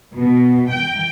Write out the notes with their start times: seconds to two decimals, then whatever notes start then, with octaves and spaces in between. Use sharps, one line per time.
0.16 B2
0.71 G5